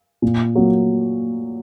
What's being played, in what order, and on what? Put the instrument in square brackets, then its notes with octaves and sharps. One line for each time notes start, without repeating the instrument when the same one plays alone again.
[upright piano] A#2
F#3 A#3